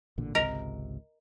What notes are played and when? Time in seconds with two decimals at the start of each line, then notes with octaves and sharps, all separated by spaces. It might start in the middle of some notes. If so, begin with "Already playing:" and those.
0.18 A1 A#2 D3
0.35 G#1 C#2 C3 A#4 D#5